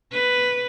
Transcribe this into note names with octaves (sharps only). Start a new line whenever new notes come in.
B4